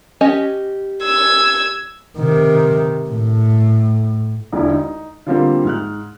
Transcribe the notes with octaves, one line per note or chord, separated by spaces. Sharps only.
C#4 G4 D#5
E6 G#6
C3 D#3
A2
E1 D2 E4
D#4
D3 F3 G3 A#3 C4
G#2 F6 F#6